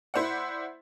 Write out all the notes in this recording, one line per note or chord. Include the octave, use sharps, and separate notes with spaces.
E4 C5 D5 F#5